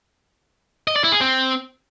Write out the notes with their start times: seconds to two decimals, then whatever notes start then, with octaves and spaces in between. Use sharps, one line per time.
0.88 D#5
0.96 D5
1.04 E4
1.12 G#4
1.21 C4